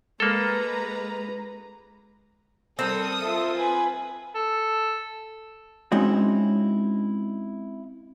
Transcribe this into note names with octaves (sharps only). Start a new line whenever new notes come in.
G#3 A#3 A4 B4 A#5
G3 C4 A4 A#4 D#6
F4 E5
B4 G#5
A4
G#3 C4 C#4 D#4 E4 F#4